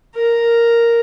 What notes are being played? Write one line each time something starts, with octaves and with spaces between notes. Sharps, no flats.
A#4